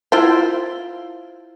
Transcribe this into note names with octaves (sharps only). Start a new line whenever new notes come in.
E4 F4 C5